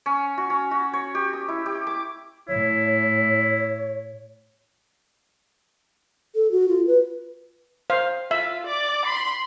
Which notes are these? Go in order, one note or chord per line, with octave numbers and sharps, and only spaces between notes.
C#4
F#4
C#4
F#4
C#5
G4
D#6
E4
G4
D6
A2 E4 C#5
A4
F#4
F4
B4
C5 F5
F4 E5
D5 D6
B5 C6